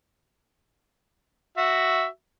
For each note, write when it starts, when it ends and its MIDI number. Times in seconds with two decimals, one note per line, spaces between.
1.57 2.06 66
1.57 2.06 76